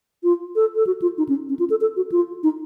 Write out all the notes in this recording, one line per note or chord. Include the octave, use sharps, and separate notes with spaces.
F4
A4
A4
F#4
F4
D#4
C#4
C#4
F4
A4
A4
F#4
F4
D#4